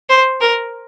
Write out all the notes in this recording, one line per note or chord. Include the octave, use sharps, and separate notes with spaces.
C5
A#4